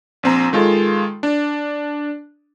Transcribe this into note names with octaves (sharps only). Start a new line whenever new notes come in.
A#1 C4 A#5
D#3 G#3 F4 A4
D4